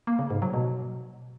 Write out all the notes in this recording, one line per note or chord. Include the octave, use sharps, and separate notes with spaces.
A#3
C#3
G#2
F#3
B2